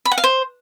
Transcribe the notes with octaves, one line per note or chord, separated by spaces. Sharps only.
B5
F#5
F5
C5